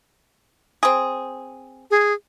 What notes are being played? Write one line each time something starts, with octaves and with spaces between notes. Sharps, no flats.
C4 G#4
G#4